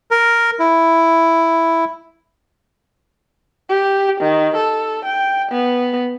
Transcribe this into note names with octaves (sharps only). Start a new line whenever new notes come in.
A#4
E4
G4
D#3
A4
G5
B3